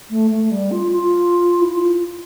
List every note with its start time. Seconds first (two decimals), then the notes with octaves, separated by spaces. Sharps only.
0.11 A3
0.31 A3
0.51 G3
0.71 F4
0.92 F4
1.62 E4
1.73 F4